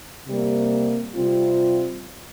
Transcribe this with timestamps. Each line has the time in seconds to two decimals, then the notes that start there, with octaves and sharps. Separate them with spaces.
0.26 C3 G3 A#3
1.15 C3 G3 C4 F4